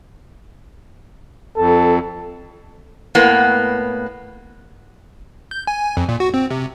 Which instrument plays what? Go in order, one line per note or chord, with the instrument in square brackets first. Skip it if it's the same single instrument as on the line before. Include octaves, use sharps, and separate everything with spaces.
[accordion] F2 [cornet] A4
[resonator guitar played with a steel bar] A2 A#3 B3
[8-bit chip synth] G6
G#5
F2
A#2
F#4
C4
C3